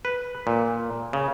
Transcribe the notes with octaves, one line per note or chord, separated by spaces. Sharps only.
B4
A#2
C#3